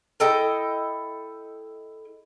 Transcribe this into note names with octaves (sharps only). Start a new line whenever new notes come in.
E4 A4 D#5 G5